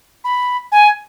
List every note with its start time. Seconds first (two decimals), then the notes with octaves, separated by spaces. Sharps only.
0.24 B5
0.72 G#5